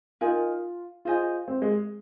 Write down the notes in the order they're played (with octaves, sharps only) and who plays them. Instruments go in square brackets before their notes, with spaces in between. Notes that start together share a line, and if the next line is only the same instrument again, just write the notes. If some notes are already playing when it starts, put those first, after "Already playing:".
[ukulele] D#4 A#4 G#5 [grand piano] F4
[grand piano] F4 [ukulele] G#4 C5 D#5 G#5
[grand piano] C4
G#3